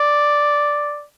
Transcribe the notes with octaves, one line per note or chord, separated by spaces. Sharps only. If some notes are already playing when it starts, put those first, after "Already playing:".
Already playing: D5